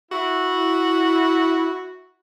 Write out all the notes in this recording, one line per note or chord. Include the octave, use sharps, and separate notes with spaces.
E4 F#4